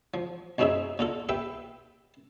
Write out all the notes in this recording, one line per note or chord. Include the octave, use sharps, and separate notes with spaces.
F3
B1 F#2 C4 D#4 G#4 E5
A#2 F4 A4
G4 B4 E5 G5